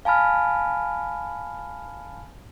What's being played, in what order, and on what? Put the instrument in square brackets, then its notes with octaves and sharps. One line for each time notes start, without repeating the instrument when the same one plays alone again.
[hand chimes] F5 G#5 A5 B5 F6